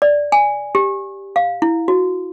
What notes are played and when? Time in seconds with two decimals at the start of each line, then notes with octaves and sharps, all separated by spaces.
0.02 D5
0.32 G#5
0.75 G4
1.36 F5
1.62 E4
1.88 F#4